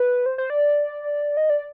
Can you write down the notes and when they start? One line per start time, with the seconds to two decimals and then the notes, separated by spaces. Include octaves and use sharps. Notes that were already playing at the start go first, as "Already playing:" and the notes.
Already playing: B4
0.26 C5
0.38 C5
0.50 D5
1.37 D#5
1.50 D5